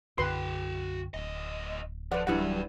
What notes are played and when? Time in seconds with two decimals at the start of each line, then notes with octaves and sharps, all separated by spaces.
0.18 B1 F#2 D3 F#4 B4 G5 C6
1.14 D1 D2 D#5
2.12 F3 B4 D5 F#5
2.27 E3 F#3 G3 D4 E4 B4 D5 F#5